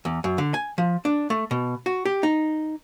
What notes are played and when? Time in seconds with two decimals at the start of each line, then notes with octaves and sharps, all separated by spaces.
0.05 E2
0.24 F#2
0.38 D3
0.54 G#5
0.78 F3
1.05 D4
1.30 A3
1.51 B2
1.86 F#4
2.05 G4
2.23 D#4